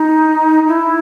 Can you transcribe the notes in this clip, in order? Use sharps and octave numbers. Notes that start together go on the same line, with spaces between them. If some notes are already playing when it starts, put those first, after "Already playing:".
Already playing: D#4
E4